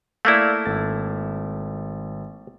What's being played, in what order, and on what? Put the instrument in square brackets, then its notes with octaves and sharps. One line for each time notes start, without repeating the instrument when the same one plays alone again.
[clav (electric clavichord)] A3 A#3 E4 [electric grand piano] D5 F5
[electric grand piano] G#1 A4 A6